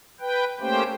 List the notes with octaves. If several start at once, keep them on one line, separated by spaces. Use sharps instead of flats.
B4 G5
A3 A#3 C#4 G4 C5 G5